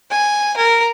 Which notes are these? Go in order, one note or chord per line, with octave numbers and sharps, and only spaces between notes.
G#5
A#4